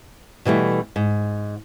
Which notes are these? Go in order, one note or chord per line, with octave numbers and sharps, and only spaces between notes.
B2 E3 G3 A3
G#2